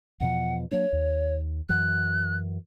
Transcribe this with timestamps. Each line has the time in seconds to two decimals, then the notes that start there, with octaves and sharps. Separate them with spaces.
0.20 E2 B2 F3 F#5
0.71 F#3 A#3 D4 C#5
0.93 D#2
1.69 F#2 E3 F#3 F#6